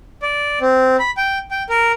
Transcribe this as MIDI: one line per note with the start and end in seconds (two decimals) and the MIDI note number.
0.22 0.59 74
0.61 0.96 60
0.99 1.11 83
1.17 1.38 79
1.51 1.63 79
1.70 1.92 70